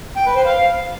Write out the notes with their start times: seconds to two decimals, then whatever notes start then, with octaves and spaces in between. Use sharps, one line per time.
0.16 G5
0.26 B4
0.36 C5
0.45 F5